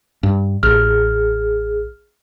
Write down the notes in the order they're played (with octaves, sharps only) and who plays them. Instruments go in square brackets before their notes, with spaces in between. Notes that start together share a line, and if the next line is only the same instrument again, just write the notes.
[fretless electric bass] G2
[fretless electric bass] A1 [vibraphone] G#4 [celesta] F6